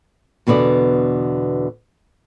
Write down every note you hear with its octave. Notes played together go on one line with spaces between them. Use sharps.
E2 B2 D3 B3 D5